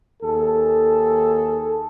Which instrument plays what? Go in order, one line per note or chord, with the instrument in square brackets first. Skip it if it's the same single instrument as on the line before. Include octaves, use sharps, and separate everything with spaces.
[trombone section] D#2 G#4 A4